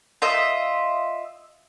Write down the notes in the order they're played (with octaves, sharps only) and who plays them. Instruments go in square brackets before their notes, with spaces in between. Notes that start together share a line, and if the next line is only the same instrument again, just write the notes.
[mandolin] F4 D#5 E5